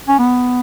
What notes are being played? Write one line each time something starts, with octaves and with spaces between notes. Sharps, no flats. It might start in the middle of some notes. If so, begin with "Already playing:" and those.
C#4
B3